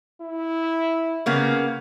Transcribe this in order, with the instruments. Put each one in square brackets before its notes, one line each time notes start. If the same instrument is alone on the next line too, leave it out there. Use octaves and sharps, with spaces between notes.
[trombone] E4
[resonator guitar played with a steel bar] C#3 A#3 B3